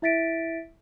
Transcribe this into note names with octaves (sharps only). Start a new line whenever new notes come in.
E4 E5 A6 B6 D7